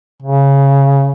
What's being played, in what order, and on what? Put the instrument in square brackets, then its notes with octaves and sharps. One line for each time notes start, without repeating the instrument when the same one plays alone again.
[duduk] C#3